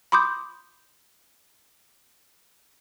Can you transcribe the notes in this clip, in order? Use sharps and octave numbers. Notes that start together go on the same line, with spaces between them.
B5 C6 D6 D#6 G6